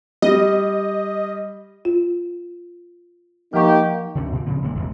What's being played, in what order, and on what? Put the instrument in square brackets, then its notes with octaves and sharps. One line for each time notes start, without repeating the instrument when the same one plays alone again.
[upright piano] G3 [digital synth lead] D#5
[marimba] F4
[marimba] F3 F#5 C#6 [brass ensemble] A#3 D#4 G4
[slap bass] D2 C3 E3 C#4
A#2 E3
C#3 F3 C4
F#1 A#2 D#3 G#3
E1 A1 E2